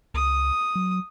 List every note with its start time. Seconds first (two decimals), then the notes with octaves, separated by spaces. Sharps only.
0.14 C#2 D#6
0.76 F#3